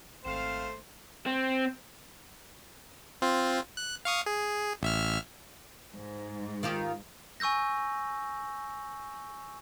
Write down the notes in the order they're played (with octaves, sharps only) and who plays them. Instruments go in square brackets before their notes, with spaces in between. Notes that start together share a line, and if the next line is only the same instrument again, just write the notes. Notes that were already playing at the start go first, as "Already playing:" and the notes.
[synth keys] G#1 E7 [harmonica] A3 C5 [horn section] C4 F5
[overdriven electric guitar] C4
[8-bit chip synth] C4 F4
F#6
F5 C#6 D#6
G#4
A1 E5 F6
[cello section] G#2
[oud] D#3 F4 G4
[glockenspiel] G#5 C#6 E6 G6 A#6